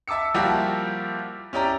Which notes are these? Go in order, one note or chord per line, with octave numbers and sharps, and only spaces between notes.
E5 A5 D6 E6 C#7
F3 G3 A#3 E4 F#4 G4
C#4 E4 G4 D5 A#5